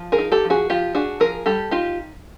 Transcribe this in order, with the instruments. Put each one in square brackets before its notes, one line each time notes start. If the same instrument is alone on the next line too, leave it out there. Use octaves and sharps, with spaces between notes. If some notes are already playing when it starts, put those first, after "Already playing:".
Already playing: [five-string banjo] F3
G#4 A#4
D#4
G4 A4
F3
F#4 G#4
F3 F4 G4
D4 F#4 G#4
F3 G#4 A#4
G3 G4 A4
D#4 F4 G4